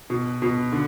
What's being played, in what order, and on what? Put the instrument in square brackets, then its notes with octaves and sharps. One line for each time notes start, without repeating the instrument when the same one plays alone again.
[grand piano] B2
B2
D3